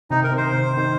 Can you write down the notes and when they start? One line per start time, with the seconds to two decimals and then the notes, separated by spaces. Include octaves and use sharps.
0.10 C3 D#4
0.24 A#4
0.31 D#3 C4
0.37 C5
0.52 C3
0.71 C4
0.76 D#3